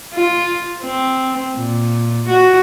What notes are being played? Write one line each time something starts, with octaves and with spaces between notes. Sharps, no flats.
F4
C4
A#2
F#4